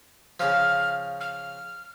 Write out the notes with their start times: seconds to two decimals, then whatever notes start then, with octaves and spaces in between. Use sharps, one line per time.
0.40 C#3 F3 F6
1.20 F6